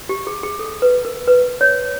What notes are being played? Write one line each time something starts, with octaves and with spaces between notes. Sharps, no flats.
G4
G#4
G#4
A4
B4
A#4
B4
C#5